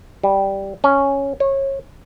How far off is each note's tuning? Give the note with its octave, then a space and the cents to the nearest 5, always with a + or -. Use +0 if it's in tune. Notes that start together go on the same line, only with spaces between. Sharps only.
G3 -5
C#4 +0
C#5 -25